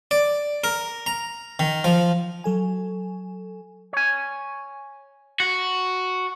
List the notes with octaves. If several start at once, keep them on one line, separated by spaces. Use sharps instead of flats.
D5
A#4
A#5
D#3
F3
F#3 A4 G#5
C#5 G#5
F#4